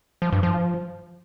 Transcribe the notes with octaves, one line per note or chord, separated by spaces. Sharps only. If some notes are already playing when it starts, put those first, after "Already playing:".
F3
G2
F3